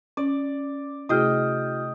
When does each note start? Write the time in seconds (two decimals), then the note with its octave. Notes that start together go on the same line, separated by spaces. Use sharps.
0.17 C#4 D5
1.09 C3 A3 E4 F#4 G#4 D#5 G5 F6